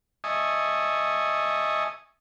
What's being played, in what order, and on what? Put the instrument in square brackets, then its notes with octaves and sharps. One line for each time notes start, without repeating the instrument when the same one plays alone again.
[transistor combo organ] D#5 E5 G#5 A5 C#6 D#6